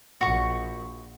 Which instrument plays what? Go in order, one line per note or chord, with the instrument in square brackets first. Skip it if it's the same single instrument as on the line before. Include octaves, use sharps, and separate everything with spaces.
[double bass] A#1 [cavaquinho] F#4 C#6